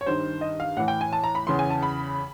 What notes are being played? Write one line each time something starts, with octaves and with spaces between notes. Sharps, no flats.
C#5
G2 D#3 C5
D#5
F5
A2 E3 F#5
G5
G#5
A5
A#5
B5
E2 C#3 E3 C6
G#5
A5
B5